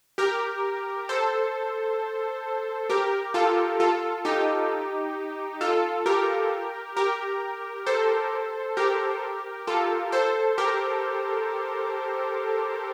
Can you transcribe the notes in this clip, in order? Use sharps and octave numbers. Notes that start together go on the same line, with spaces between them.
G4 A#4
A4 C5
G4 A#4
F4 A4
F4 A4
D#4 G4
F4 A4
G4 A#4
G4 A#4
A4 C5
G4 A#4
F4 A4
A4 C5
G4 A#4